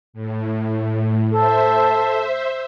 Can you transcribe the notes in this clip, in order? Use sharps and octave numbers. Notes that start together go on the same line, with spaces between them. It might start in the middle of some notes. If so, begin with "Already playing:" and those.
A2
A4 C5 E5